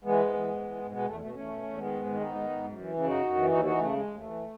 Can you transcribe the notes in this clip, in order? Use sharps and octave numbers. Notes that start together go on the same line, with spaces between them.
E3 G#3 B3
G#2
E3
G#2
E3
G#2
B2 G#3 B3
E2 A3
B2 A3
E2 A3 C#4
B2
E2
D#3 G#3 B3
G#2
D#3
G#2 B3 D#4
D#3
G#2
F#2
E3
C#3
F#2 D#4 F#4
F#2
E3
D#2 D#4 F#4
E3 D#4 F#4
C#3 A3
D#2 G#3
D#2
A3
E3